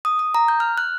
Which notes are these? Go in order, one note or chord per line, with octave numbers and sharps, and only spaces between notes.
D#6
D#6
A#5
G6
F6
F#6